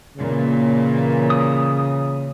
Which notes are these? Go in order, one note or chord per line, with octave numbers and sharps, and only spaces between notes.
A#2 C#3 E3
D#6